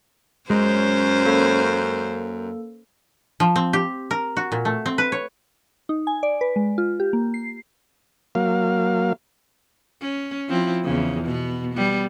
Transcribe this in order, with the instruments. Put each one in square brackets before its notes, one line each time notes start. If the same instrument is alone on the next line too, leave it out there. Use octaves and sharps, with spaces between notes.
[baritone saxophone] F#2 [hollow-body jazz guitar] G#3 [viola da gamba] C#4 C5
[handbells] A#3 A4
[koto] F3
C4
G4
A#4
F#4
A#2
A3
C4
B4
C#5
[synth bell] D#4
G#5
D5
B4
G#3
F4
G4
A#3
C7
[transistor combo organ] F#3 A#3 F5
[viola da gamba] C#4
F3 C4 E4
E2 C#3
B2 B3
G3 B3